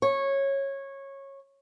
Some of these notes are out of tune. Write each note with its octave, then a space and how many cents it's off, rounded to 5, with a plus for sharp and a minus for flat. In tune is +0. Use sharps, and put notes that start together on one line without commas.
C#5 -15